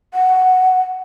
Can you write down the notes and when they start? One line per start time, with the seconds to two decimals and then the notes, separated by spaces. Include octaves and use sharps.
0.14 F#5